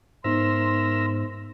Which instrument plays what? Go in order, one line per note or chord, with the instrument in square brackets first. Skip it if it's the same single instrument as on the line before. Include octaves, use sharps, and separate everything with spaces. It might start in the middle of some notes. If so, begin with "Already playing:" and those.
[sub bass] G#2 [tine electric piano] B3 D#4 C5 [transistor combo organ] A#4 E5 [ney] C6